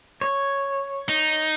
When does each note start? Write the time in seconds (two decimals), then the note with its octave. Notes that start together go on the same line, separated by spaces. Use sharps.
0.21 C#5
1.09 D#4